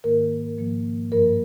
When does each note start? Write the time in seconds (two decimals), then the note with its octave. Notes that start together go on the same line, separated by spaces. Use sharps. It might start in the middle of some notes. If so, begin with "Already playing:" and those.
0.04 G#2 D#3 A#3 A#4
0.58 G#2 F3 A#3
1.12 G2 F3 A#3 A#4